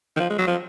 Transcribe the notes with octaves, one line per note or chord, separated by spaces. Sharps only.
D#3
F3
G#3
F#3
F3